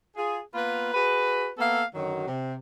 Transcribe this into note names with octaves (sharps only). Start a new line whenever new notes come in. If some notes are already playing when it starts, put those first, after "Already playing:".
F4 G#4
A#3 B3 F4 B4
F#4 G#4 B4
A#3 B3 A4 E5 F5
F#2 D3 D#3 F#3
C3